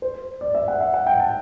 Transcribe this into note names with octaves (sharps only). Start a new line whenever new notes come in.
C5
D5
E5
F#5
E5
F#5
G5
A5